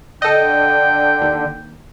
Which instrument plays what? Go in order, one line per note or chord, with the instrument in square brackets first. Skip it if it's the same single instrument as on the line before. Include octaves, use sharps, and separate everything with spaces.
[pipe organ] D3 [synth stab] A4 D#5 [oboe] G5
[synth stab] D#2